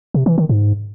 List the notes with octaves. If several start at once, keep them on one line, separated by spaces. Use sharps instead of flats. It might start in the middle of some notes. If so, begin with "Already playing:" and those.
C3
E3
D#3
G#2